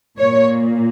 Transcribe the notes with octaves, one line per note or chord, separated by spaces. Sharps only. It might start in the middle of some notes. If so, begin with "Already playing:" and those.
A#2 C#5